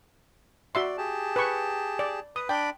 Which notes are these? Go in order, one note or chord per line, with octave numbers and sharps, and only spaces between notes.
F#4 D5 E5 C6
G4 G#4 A5
B4 C#6
D5
B4 D#6
D4 D5 G5 B5